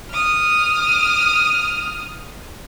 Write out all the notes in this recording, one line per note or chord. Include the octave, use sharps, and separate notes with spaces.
D#6 F6